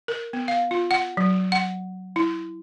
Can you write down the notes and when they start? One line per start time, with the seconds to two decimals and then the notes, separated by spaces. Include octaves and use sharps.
0.08 A#4
0.33 B3
0.48 F5
0.71 F4
0.91 F#5
1.17 F#3
1.52 F#5
2.16 E4